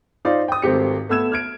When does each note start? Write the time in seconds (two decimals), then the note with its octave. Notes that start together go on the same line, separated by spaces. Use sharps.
0.25 D#4 F4 C5 D5
0.48 G5 D#6
0.62 G#1 A3 C4 G4 C#7
1.09 A3 B3 E6 G#6 E7
1.32 F6 G#6 D7